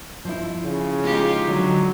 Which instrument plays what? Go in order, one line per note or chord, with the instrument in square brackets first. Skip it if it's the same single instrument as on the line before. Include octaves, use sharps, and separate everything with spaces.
[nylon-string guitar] F3 E4
[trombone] C#3
[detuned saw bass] G#3 [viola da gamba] D#4 F4 G4
[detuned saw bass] D3 [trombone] F#3 [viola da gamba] G#3